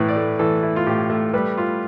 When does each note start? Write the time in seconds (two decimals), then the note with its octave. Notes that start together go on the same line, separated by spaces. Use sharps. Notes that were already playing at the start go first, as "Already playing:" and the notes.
Already playing: A2 E3 E4 B4
0.08 D5
0.16 A3
0.39 E3 A4
0.63 E4
0.76 F4
0.87 A2 G4
1.10 A3
1.34 G3 B4
1.57 F4